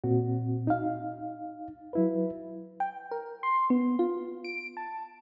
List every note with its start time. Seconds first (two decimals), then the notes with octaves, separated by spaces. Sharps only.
0.04 A#2 C4 F#4
0.67 D#4 F5
1.93 F#3 E4 B4
2.80 G5
3.11 A#4
3.43 C6
3.70 B3
3.99 F4
4.45 D7
4.77 A5